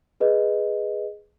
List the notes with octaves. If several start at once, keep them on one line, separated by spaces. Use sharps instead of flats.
G#4 B4 D#5